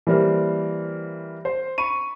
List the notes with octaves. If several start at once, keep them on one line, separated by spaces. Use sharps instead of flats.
E3 G3 A#3 A#4 C5
C5
B5 C#6 D#7